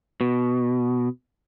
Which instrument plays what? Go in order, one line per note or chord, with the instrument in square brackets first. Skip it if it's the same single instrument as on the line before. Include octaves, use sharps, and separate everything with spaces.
[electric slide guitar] B2